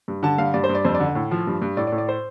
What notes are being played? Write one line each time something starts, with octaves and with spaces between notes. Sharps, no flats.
G2
D3 A5
G2 F5
G2 D5
C5
G2
D5
F2 C5
D5
D3
A2
F3
G2
G2
A2 D5
D5
A2
D5
C5